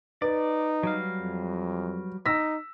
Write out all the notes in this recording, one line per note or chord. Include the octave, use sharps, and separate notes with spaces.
D#4 B4 D5
F#3 G3 F5
F2
D#4 E6 A#6 B6